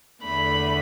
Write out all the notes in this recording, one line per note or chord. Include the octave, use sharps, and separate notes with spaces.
E2 D3 A3 B5